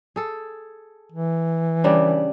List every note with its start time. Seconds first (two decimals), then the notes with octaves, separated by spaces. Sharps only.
0.16 G#4 A4
1.12 E3
1.84 C#3 G3 D4